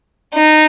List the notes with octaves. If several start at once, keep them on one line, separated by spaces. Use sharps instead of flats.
D#4